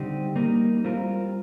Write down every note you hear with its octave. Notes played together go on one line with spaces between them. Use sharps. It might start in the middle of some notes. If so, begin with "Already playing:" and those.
Already playing: D3 G3 C4 D#4 G4
G3 A#3 D#4 A#4
G3 C4 F4 A#4